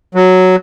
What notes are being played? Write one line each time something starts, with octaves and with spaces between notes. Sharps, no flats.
F#3